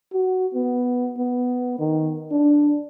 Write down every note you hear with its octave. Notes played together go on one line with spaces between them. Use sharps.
F#4
B3
B3
D#3
D4